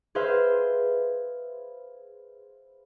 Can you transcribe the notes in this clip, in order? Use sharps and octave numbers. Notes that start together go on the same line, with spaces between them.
G#4 B4 C5 E5 F5